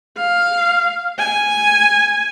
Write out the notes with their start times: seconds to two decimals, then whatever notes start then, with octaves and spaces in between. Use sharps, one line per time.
0.17 F5
1.18 G#5